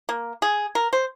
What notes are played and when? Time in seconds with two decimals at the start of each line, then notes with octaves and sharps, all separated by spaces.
0.09 A#3
0.42 G#4
0.75 A#4
0.93 C5